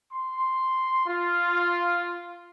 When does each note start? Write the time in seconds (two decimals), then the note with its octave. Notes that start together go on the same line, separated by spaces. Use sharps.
0.13 C6
1.06 F4